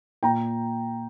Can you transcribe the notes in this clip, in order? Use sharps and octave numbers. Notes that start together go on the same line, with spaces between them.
A#2 G5 A#5